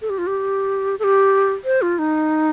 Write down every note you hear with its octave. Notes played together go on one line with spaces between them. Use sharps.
A4
G4
F4
G4
A4
G4
C5
F4
D#4